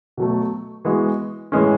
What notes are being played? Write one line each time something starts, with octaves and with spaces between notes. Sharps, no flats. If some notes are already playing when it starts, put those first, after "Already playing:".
B2 F#3 A3
E3 G#3 B3 F#4
A2 E3 G#3 C#4